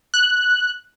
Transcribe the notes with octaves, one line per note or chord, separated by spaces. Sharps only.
F#6